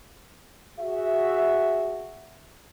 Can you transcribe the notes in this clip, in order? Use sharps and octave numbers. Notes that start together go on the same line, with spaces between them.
F#4 G#4 E5